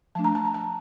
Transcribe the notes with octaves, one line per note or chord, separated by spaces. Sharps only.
F3 A3 D4 A5
A#5
A5
A#5
A5